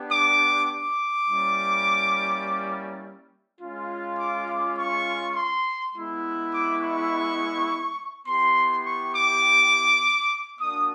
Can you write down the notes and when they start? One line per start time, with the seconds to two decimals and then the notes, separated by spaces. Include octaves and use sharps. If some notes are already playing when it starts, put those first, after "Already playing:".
Already playing: B3 D4 G4
0.11 D6
0.70 D6
1.28 G3 A#3 C#4 E4
3.61 G#3 C#4 F4
4.19 D6
4.48 D6
4.77 C#6
5.35 C6
5.94 G#3 B3 E4
6.52 D6
6.81 C#6
8.27 B3 E4 G4 C6
8.84 C#6
9.14 D6
10.59 A#3 D4 F#4 D#6